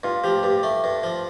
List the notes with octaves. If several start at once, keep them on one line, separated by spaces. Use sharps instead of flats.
G2 F4
F3 G4
G2 G4
A3
G2
F3